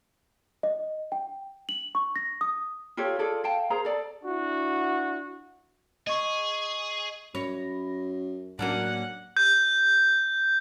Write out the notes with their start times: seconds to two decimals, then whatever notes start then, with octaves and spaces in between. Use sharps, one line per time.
0.63 D#5
1.12 G5
1.69 F#7
1.95 C#6
2.16 A#6
2.41 D#6
2.97 F4 G4 A4 C#5
3.19 F4 G#4 A4 D5
3.44 F5 G5 A5
3.70 G#4 A#4 C5 A#5
3.85 A4 D5
4.24 D4 E4 F#4
6.07 G#4 D#5 C#6
7.35 F#2 C#5 B5 A#6
8.59 A2 F#3 A#3 C#4 D4 F#4 F#5
9.37 G6